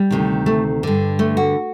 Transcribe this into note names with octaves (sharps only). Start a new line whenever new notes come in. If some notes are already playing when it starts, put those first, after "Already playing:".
Already playing: G3
D2 C3 D#3
A3
G2 D3
A3
F#4